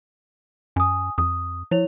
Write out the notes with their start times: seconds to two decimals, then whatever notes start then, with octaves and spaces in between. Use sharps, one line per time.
0.76 F#2 G#5 D#6
1.18 F2 D#6
1.71 F3 E4 C#5 F7